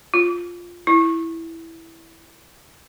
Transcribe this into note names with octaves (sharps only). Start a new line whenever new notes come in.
F4
E4